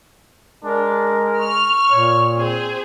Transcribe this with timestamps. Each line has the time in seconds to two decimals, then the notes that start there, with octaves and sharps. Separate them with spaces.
0.64 G#3 D4 A#4
1.40 C#6 F6
1.91 A#2 C#5
2.38 C4 G#4 C5